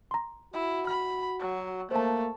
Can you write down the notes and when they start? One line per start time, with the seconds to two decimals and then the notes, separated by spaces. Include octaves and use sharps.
0.11 A#5 C6
0.54 E4 F#4
0.87 B5 F6
1.40 F#3
1.91 A3 A#3 C5 A5